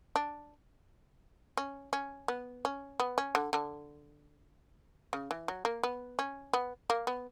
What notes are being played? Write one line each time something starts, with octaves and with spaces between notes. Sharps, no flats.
D4
C#4
C#4
B3
C#4
B3
C#4
D3
D3
C#3
E3
F#3
A#3
B3
C#4
B3
A#3
B3